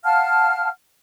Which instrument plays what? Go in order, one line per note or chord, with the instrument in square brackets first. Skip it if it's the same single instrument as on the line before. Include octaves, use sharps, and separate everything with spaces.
[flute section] F5 F#5 A5 F6